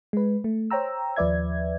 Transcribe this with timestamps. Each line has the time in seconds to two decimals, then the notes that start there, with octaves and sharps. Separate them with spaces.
0.13 G#3 B4
0.44 A3
0.71 C5 C#5 G5 A#5 E6
1.16 D#2 F3 B4 D5 E5 G#6